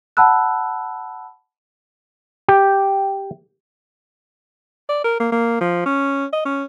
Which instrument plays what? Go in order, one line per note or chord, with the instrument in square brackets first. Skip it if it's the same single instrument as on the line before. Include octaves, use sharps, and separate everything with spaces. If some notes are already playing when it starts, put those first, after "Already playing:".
[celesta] F#5 A5 B5 E6 F#6
[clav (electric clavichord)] G4
[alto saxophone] D5
A#4
A#3
A#3
F3
C#4
D#5
C#4